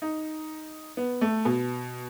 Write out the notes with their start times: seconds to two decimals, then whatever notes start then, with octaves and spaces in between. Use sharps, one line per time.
0.02 D#4
0.97 B3
1.21 A3
1.45 B2